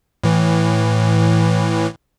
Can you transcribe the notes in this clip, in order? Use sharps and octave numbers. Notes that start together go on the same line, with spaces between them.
A2 E3